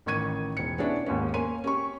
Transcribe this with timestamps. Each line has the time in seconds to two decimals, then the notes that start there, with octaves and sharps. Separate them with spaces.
0.06 A1 D#3 C#6 G#6 D#7
0.57 E1 C#7
0.78 B3 C#4 D4 E4
1.06 D#2 G#2 C#4
1.34 A#3 C#5 G#5 C6 D#7
1.64 C#4 G4 C#6